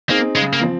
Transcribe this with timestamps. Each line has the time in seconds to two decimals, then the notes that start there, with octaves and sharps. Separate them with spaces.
0.09 A#3 C4 D#4 G#4
0.36 C#3 G#3
0.53 A#3
0.61 F3 C4